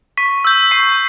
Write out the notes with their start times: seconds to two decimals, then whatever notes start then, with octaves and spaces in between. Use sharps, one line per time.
0.17 C#6 B6
0.45 E6 G6
0.71 C#6 C7